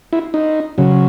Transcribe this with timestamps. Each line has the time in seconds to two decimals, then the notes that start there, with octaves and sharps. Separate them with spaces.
0.13 E4
0.34 D#4
0.78 C#3 F#3